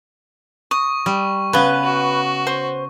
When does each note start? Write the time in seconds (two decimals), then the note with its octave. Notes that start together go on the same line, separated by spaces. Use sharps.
0.71 C#6 D#6
1.06 G3
1.53 C#3 B3 B4
1.85 F#4
2.47 C5